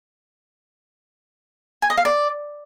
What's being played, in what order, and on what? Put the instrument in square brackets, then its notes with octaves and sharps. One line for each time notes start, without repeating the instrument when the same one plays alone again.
[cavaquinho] G#5
D#5
F5
D5